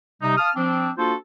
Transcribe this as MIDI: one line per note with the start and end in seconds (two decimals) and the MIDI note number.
0.22 0.36 48
0.22 0.36 55
0.22 0.36 63
0.38 0.51 77
0.38 0.51 81
0.38 0.51 87
0.38 0.51 89
0.56 0.90 53
0.56 0.90 60
0.56 0.90 62
0.98 1.13 58
0.98 1.13 62
0.98 1.13 65
0.98 1.13 66
0.98 1.13 69
0.98 1.13 72